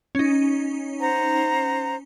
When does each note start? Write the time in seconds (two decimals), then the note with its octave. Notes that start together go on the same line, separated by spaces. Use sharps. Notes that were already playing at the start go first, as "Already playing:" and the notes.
0.15 C#4 D#4
1.01 C5 F#5 A#5